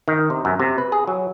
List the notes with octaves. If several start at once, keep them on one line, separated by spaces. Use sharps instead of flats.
D#3
C3
F#2
C3
B4
G#4
F#3